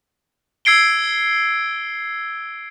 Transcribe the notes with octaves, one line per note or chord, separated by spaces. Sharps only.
E6 G#6 C7 D7 G7